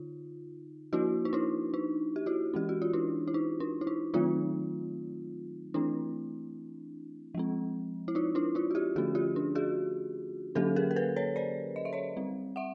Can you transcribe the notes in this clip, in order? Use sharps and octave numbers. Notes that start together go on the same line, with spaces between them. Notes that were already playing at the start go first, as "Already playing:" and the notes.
Already playing: D3 D#4 F4
F3 A#3 D4 E4 F#4
D#4
D4 E4
D#4
G4
E4 F#4
E3 G#3 C#4 G4
F#4
F4
D4 E4
E4
D#4
D4
E4
D#4
D#3 F#3 A3 C4 D#4 F4
E3 A3 C4 D4 E4
F3 G#3 C4
E4
D#4 F4
D4 E4
D#4 F4
F#4
F4 G4
D3 F3 A3 C#4 F#4 G#4
F4 G4
D4
F#4 G#4
D3 F#3 A#3 C#4 G4 A4
G#4 A#4
A#4
A4 B4
B4 C#5
C5 D5
D#5
E5
C#5 D#5
G3 C4
E5 F#5